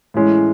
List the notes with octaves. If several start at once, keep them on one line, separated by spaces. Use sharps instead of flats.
A2 E3 G#3 C#4